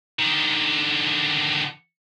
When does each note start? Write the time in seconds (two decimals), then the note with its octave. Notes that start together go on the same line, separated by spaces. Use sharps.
0.19 D3 D#3